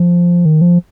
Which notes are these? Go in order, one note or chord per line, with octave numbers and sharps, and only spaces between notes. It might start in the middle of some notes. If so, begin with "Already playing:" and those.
Already playing: F3
D#3
F3